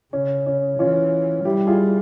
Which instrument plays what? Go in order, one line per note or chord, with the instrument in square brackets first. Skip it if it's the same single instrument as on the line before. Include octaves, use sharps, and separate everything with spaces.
[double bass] C#3 [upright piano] C#4
[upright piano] C#4
[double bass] E3 [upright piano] C#4 F4
[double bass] G3 [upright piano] E4 G4
[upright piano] F4 G#4